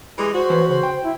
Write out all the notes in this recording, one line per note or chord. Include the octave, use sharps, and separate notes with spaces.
E3 G3 G#3
F#4 C5
E3 B4 C#5
C#3 C5
G5
E4